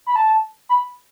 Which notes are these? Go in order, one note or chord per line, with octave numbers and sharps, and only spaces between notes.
B5
A5
B5